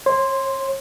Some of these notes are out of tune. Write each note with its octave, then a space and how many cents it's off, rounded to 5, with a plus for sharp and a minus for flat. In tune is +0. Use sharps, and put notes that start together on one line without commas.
C#5 -35 C6 +0